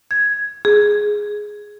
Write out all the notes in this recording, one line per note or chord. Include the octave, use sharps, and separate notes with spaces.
G#6
G#4